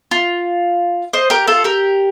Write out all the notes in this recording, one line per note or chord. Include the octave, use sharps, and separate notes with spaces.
F4
C5 D#5
G4 A#4
F4 A4
G4 A#4